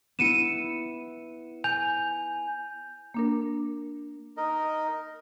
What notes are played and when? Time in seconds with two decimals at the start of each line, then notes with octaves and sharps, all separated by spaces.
0.19 B3 E4 C#7 D#7 E7
1.64 G#5 G6 F7
3.14 A#3 D4 A#4
4.37 D#4 A#4 D#5